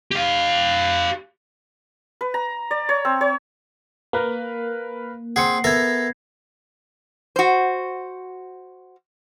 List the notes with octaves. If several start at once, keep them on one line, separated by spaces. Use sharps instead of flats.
G4 F5
B4
A#5
D5
C#5
C4
C#5
A#3 A#4 B4 F5
C4 G#4 F#5 C7 C#7
B3 A4 A#4 E5 G#6 A#6
F#4 C5